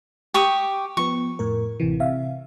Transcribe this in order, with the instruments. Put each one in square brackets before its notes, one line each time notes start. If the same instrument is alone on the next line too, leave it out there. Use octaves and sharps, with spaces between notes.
[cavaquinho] G4 C#6 D#6
[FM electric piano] F3 B3 [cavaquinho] C#6
[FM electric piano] F2 A2 A#4
A1 C3 E3
C3 E5 F5